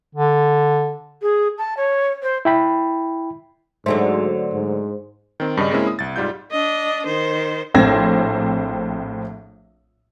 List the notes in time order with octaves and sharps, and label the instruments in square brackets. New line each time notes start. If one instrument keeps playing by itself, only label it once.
[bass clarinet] D3
[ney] G#4
A5
C#5
C5
[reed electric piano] E4 G5 B5
[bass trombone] G#2 [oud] D3 F#3 A3 [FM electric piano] C5
[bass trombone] G#2
[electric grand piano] D#3 C4
G2 C#3 G3 D#5
G#3 A#3 C4 C#4 E4
D#6
C2 A6
G#2 G3 F4 G6
[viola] D4 D#5
D#3 C5
[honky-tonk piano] A#1 A2 C4 G#6 A#6